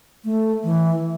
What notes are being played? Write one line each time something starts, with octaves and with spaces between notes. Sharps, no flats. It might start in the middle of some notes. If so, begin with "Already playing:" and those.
A3
E3